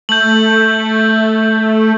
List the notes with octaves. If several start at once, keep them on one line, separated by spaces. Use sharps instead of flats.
A3 G6 F#7